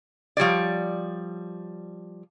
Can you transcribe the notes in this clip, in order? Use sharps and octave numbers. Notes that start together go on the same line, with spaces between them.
F3 G3 C#5 D5